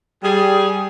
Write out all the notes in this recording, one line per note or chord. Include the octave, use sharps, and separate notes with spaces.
G3 G#4